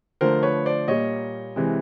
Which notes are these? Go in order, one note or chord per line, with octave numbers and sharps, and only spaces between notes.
D3 F3 A3 A#4 C5
B4 C#5
C5 D5
A#2 G3 A#3 C#5 D#5
C3 E3 G#3